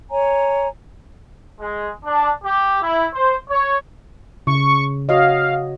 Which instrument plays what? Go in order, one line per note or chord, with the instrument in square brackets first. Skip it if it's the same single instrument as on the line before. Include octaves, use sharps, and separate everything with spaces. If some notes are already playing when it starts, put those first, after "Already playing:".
[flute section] C#5 G#5 A#5
[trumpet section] G#3
D4
G4
E4
C5
C#5
[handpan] C#3 [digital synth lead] C#6
[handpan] F#4 C#5 D#5 [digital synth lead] F5